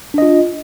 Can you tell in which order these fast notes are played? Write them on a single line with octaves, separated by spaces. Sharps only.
D4 D#5 F4